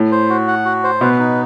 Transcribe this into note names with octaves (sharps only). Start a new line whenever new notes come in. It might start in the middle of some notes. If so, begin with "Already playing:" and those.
Already playing: A2
C5
F#4
F#5
F#4
C5
B2 B4
D#4